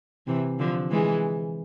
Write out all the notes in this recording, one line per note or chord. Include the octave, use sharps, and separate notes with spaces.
C3 E3
D3 F3
E3 G#3